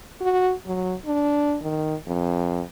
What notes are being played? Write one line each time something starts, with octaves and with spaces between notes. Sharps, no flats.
F#4
F#3
D4
D#3
F2